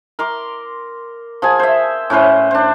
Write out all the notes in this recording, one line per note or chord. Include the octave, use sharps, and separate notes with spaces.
A#4 C6 D6
F3 G#4 G#5
C5 E5
A2 C#4 B4 C5
D4 C5